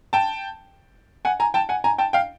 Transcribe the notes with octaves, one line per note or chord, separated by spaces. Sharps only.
G5 A5
F#5 G#5
G#5 A#5
G5 A5
F#5 G#5
G#5 A#5
G5 A5
F5 G5